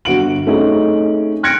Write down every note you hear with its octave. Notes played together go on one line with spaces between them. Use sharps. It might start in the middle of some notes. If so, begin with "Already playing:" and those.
G1 F#4 D7 F#7
A3 C4 C#4 D#4 G#4
F6 F#6 G#6 A#6 C#7 D7